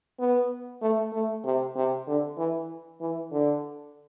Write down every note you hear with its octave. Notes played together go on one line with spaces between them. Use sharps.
B3
A3
A3
C3
C3
D3
E3
E3
D3